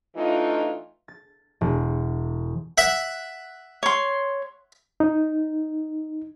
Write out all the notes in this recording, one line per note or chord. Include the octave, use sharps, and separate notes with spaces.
E3 A3 D4 D#4 F4
A6
E1
E5 F#5
C#5 C6
D#4